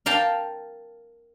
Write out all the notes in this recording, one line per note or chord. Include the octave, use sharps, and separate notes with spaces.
A#4 F5 G5 A5